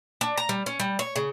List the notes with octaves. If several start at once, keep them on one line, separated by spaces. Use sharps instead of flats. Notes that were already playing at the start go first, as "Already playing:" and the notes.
D4
A#5
G3
C#4
G3
C#5
C#3